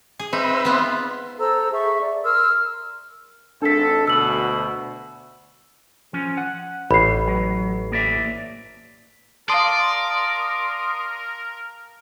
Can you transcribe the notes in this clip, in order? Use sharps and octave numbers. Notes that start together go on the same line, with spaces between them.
G#4
C4 D#4 B4 E5
B3 F4
A4 C5 A#5 E6
G#4 E5 C#6
D5
A#4 C6 E6 F6
G#1 D4 A4 B6
D2 B2 E6 F#7
F3 C#4
F#5
A1 B5 C7
F#3
A#3 D5 E5
A#4 D5 F5 A5 C6 D#6